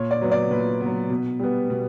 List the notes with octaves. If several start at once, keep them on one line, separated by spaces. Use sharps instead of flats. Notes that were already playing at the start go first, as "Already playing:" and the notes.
Already playing: A#2 C#5
D5
F#3 B3
D5
A#2 B4
B3
F#3
B2
G3 B3
B2